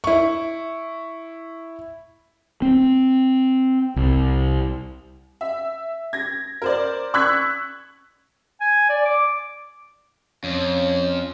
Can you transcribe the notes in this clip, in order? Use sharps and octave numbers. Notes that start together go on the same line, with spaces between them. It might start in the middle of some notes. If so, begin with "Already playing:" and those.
E4 C#6
C4
C2
E5
G#6 A#6
A#4 C5 D5
C#6 E6 F#6 G#6 B6
G#5
D5
D6
F2 C#4